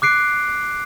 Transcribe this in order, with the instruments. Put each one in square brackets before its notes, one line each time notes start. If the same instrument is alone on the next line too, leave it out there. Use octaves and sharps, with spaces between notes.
[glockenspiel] D6 F#6 C7 D7